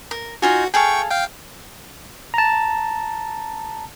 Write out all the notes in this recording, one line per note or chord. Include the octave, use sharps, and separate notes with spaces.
A#4
D#4 F4 F#4 G#5
G#4 A4 F5 G5 C#6
F5 G5
A5 A#5